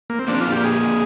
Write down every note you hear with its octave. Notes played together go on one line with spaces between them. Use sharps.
A#3
C4
D3 F3 A#3 D4
F4
G4
G#4